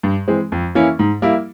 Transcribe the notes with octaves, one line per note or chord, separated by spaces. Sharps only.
G2
E3 G#3 C4
F2
E3 A#3 C#4 E4
G#2
G3 A#3 E4